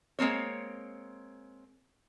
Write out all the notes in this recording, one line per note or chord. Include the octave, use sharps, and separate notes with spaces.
G#3 A#3 C4 C#5